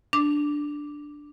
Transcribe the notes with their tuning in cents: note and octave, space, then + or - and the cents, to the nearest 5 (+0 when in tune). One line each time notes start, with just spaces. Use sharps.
D4 +0 D6 +0